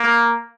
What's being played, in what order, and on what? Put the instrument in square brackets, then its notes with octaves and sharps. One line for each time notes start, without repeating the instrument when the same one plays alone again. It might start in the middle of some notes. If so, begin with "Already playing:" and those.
Already playing: [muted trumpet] A#3